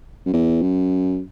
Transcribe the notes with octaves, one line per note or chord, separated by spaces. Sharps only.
F#2
E2
F#2